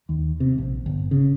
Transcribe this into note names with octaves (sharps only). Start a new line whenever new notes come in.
D#2
C3
A#1
G1
C#3